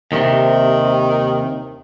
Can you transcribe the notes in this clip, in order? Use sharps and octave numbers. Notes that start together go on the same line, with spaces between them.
D#2 A2 C3 D#3